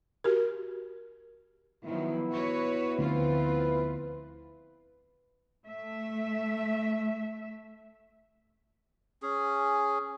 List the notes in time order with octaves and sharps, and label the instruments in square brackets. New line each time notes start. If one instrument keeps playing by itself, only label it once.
[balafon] F#4 G4 A#4
[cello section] D#3 F3 F#3 [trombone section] B3 E4
[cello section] F#4 B4 C#5
[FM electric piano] D2 [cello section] F3 C4 F4 [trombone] B4
[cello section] A3 E5
[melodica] C#4 G#4